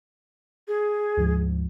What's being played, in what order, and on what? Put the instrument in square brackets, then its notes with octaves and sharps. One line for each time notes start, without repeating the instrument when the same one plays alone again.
[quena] G#4
[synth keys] D2 G#2 F3